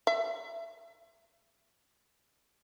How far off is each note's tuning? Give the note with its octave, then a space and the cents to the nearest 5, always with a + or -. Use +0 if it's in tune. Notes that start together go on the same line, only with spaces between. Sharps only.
E5 +20